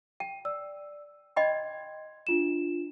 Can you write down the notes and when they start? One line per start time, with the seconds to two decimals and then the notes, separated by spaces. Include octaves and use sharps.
0.20 G5 D#7
0.45 D5 E6
1.36 D#5 G5 B5 C6 G#6
2.27 D4 F4 E7